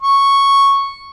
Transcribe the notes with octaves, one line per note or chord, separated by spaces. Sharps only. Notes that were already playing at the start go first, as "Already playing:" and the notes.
C#6